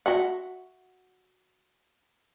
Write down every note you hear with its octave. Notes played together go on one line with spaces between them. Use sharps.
F#4 E5 F#5